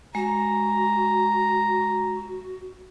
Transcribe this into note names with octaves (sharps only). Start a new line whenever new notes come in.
G#3 F#4 A#5